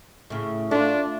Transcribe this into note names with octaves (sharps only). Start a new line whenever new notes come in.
A2 C#3
A3 D4 F4